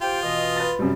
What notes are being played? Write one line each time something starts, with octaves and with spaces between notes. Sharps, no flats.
F4 G4 C5 G5
B2 E3 D#5
B4 A6
F#2 C3 G3